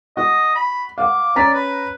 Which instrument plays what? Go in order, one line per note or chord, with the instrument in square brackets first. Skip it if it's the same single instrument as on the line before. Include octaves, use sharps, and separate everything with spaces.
[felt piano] F#4 [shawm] D#5
[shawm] B5
[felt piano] F5 F#5 [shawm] D6
[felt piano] C#4 A#5 B6 [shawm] D5
[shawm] B4